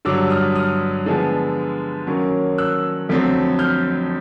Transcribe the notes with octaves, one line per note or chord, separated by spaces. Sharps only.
G2 D3 F#3 D6 E6
D#6 F6
D#6 F6
D3 F3 G#3 B3
D#3 F#3 A#3 C#4
E6 F#6
F2 D3 F#3 A3 C4
F6 G6